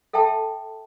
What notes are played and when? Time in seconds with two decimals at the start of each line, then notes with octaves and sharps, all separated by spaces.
0.13 A4 E5 G5 A5